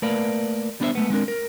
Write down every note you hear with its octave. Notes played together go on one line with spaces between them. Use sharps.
A3 A#3 A#4 B4 D5 F5
G3 B3 D4 E4 C5 E5
G#3 A3 B3
G#3 C4 D4 A#4
A#4